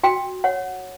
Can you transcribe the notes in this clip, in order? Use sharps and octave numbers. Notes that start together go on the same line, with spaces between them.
F#4 G5
C#5 F#5